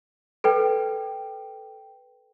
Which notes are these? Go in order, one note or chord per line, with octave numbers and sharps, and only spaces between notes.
A4 B4 G5